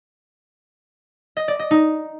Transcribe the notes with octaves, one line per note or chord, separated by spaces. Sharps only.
D#5
D5
D#5
D#4